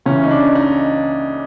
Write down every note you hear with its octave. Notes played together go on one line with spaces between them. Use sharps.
C#2 C#3 E3 C#4
D#4
D4
D#4